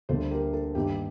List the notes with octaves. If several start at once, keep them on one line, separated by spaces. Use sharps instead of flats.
D2 D3 G3 A#3 A4 C5
G4 A#4
A4
G2 D#3 A#3 G4